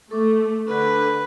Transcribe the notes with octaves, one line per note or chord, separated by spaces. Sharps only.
A3 A4 C#6 D6
D3 B4